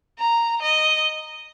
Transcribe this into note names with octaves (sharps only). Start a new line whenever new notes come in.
A#5
D#5